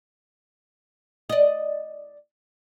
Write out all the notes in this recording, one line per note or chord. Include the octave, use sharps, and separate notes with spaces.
D5 D#5